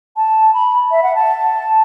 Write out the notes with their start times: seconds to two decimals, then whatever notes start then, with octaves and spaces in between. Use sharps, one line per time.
0.16 A5
0.54 B5
0.91 E5
1.03 F#5
1.15 A5